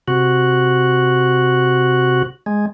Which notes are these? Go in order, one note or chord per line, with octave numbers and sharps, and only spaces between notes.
C3 F#4
G#3